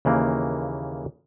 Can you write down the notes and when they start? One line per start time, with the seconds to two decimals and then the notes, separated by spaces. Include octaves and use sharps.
0.05 D#2 C#3 E3 A#3